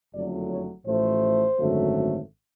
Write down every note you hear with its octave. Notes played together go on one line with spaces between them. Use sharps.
F#1 F2 D3 F#3 A3 D5
C#5
A1 A2 F3 A3 C5
G#1 F#2 D3 F#3 A3